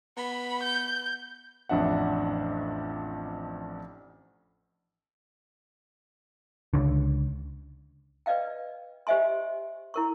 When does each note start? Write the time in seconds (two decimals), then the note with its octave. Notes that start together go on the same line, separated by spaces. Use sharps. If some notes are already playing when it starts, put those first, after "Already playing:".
0.17 B3 B5
0.63 G6
1.69 A1 F2 D4 E5 F#5
6.74 C#2 D3
8.26 B4 D5 D#5 F5 G5
9.07 G4 C5 D#5 E5 G#5 C6
9.94 E4 A#4 C#6